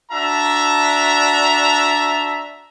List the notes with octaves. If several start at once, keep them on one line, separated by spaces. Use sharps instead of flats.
D4 F#4 E5 A5 A#5